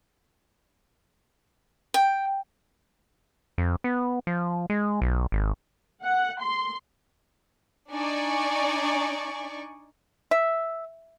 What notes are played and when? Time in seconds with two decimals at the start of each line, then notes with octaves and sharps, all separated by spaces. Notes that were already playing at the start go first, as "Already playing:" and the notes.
1.94 G5
3.58 F2
3.84 B3
4.27 F3
4.70 G#3
5.02 B1
5.32 G#1
6.04 F#5
6.42 C6
7.90 D4 D#4 D5 G#5 C#6
10.31 E5